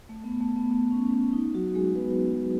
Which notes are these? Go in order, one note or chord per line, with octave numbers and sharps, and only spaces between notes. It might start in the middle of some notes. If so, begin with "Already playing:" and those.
A3
B3
A3
B3
A3
C#4
C#4
D#4
F#3 F#4
G#3 G#4
B3 B4